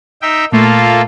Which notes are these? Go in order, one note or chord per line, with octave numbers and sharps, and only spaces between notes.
D#4 E5 G5
A#2 A3 A#3 F4 A4